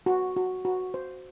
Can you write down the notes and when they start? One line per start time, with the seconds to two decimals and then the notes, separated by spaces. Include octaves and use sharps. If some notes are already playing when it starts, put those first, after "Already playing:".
0.06 F#4
0.36 F#4
0.65 F#4
0.94 C5